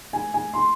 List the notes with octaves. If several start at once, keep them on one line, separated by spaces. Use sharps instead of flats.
G#5
G#5
C6